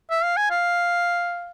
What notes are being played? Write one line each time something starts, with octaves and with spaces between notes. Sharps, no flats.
E5
F5
G#5
F5